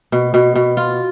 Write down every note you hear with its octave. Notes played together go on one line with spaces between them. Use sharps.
B2
B2
B2
F4